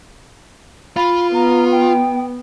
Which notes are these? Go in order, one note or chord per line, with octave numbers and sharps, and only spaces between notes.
F4 B5
B3 A#5
G5